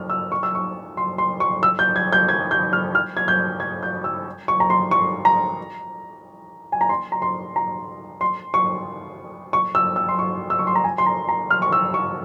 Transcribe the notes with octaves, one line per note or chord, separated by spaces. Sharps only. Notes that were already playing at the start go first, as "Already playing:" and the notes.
Already playing: F6
E6
C#6
E6
C#6
C6
C6
C#6
E6
G6
G#6
G6
G#6
G6
F6
F6
G#6
G6
G#6
G6
E6
C#6
A#5
C6
C#6
A#5
G#5
A#5
C6
A#5
C6
A#5
C6
C#6
C#6
E6
E6
C6
C#6
E6
C#6
C6
A#5
G#5
C6
A#5
A#5
F6
C#6
E6
C#6